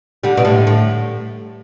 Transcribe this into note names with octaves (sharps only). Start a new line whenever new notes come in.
D3 G3
B2
A2 D3
A2